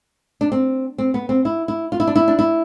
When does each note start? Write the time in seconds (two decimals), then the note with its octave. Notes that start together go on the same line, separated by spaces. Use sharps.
0.41 D4
0.52 C4
0.98 C4
1.14 B3
1.29 C4
1.45 E4
1.68 E4
1.92 F4
2.00 E4
2.07 D4
2.16 E4
2.28 D4
2.39 E4